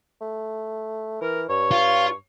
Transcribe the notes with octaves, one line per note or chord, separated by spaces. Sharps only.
A3
E3 A#4
G2 C#5
F4